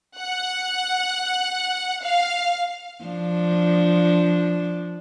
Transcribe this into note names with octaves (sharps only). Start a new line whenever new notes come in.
F#5
F5
F3 D4